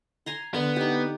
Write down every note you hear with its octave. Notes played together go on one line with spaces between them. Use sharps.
G#5 A#5 C6
D3 B3
D#4 G4